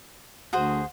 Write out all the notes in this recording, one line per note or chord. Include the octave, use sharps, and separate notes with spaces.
D2 F#4 G#4 C5